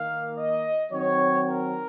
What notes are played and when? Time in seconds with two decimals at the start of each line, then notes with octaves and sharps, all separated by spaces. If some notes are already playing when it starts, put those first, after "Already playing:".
Already playing: D#3 A#3 F5
0.37 D#5
0.91 D#3 F#3 C4 C#5
1.47 A#4